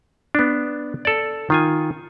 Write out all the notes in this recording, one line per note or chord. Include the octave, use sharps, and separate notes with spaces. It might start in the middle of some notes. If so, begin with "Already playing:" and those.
B3 D4
A4 D5
D#3 F4 G#5